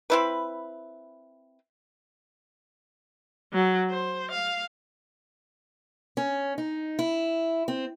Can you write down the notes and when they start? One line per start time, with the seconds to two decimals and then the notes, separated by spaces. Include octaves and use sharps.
0.10 C4 E4 B4
3.53 F#3
3.90 C5
4.31 F5
6.17 C#4
6.58 D#4
6.99 E4
7.68 C4